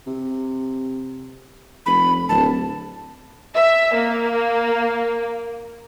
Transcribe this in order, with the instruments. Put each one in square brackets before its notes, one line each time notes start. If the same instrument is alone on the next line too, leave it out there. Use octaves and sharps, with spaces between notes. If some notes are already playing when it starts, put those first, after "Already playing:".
[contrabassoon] C3
[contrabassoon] F1 [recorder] B5
[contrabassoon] D1 [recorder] A5
[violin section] E5
A#3